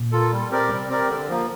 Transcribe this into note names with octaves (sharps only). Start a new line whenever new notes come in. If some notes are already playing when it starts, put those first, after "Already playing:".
Already playing: A#2
A#3 F4 A4
G3
C4 G4 A#4 D5
C3 G3
C4 G4 A#4 D5
D3
F3 A#3